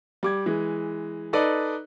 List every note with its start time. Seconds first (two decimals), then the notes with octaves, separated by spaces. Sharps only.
0.23 G3 D6 G#6
0.46 E3 G#3
1.33 D#4 A4 B4 D5 D#5